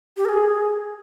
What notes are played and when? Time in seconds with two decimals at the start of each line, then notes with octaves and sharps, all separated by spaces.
0.17 G4
0.25 A#4
0.29 G#4